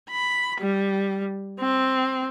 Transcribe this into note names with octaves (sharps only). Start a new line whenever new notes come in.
B5
G3
C4